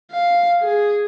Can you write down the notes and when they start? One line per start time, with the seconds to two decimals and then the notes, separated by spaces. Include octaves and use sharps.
0.12 F5
0.62 G#4